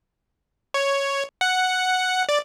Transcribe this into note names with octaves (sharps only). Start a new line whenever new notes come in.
C#5
F#5
D5